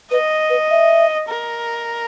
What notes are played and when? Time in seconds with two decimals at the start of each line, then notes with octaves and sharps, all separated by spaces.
0.11 B4 D#5
0.50 B4
0.70 E5
1.29 A#4